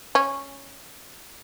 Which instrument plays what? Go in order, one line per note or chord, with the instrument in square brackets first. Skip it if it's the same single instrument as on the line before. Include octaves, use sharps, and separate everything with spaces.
[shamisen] C#4